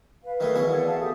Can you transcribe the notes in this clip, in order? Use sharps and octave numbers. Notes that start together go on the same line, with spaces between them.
B4 F5
D#3 F#3 A3
B2 E3 G#4 C#5
D5 F5 F#5
E5 F5 A5
G4 A4 D#6